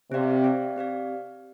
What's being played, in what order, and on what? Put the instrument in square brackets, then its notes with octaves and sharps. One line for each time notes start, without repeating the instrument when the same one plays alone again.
[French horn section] C3 [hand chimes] C4 G4 D5 F5
[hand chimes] C4 G4 D5 F5
C4 G4 D5 F5